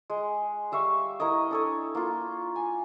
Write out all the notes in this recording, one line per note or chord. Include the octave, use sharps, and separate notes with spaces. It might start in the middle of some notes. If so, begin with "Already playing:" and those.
G#3
G3 E5 F5 C#6
E4 A#4 C#5 D#5
D4 A4 C#5
A#3 F4
G#5